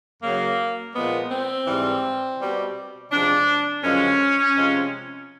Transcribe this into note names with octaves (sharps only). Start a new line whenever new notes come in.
F#2 C#3 F#3 A#3
A#2 F3 G#3 B3
C4
G#2 E3 G3
B2 G3
C3 F3 G#3 D4
F#2 D3 F3 G#3 C#4
C3 F3 G#3